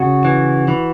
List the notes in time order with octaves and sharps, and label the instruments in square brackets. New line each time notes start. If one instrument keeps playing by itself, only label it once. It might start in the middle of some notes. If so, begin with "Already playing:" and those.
Already playing: [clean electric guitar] C#3 F#4
E3
E3